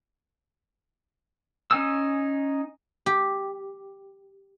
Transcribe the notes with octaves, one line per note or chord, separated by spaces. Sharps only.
C#4 D#4 G#5 D#6 E6
G4